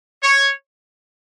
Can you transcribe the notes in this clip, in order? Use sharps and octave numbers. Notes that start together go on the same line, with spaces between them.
C#5